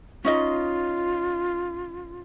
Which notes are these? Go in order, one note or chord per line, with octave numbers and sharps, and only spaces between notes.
C#4 D#4 F4 D#5